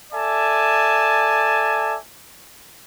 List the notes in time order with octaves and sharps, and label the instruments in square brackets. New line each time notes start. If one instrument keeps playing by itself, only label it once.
[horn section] A4 D5 E5 G#5 A5